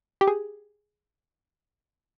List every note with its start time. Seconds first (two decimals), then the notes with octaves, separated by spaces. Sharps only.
0.21 G4
0.28 G#4